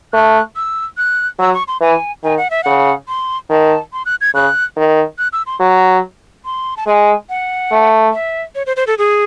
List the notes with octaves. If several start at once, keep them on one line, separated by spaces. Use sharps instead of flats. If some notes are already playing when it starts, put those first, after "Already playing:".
A3 F#6
E6
F#6
F#3 E6
C#6
C6
E3 G#5
D#3 G#5
F#5
E5
C#3 F#5
C6
D#3 A5
C6
F#6
G#6
C#3 F#6
D#3
F#6
E6
C6
F#3
C6
A5
G#3 G#5
F#5
A3
E5
C#5
C5
C5
A4
G#4